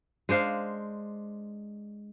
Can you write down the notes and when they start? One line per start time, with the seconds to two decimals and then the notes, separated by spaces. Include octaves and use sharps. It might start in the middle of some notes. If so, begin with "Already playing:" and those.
0.29 G#3 D4 C5 F5